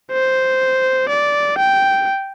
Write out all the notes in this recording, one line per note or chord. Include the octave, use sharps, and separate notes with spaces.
C5
D5
G5